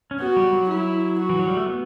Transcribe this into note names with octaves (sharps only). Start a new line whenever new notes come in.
C#4
B3 F#4
G3
F#3
E4
F#4
E3
F#3
G3
A3
B3